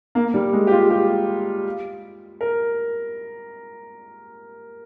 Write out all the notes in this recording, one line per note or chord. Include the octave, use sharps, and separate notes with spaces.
A#3
G3
G#3
G4
F4
G4
A#4